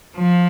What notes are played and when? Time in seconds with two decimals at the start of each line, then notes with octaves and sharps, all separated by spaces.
0.17 F3